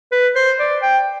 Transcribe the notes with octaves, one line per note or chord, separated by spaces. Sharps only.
B4
C5
D5
G5